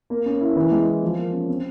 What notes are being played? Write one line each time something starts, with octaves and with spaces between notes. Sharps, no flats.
A#3
C#4
E4
E3
G#3
E4
F3
A#3
C#4
C4